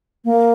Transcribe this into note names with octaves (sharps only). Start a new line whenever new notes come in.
A#3